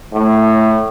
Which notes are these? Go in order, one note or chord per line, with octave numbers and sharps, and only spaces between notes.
A2